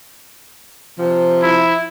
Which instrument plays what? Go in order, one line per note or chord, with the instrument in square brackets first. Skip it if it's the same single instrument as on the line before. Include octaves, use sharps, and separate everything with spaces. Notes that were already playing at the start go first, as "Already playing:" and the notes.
[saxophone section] C3 F3
[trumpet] E4